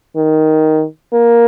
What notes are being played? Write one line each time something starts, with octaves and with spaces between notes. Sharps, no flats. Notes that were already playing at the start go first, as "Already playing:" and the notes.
D#3
A#3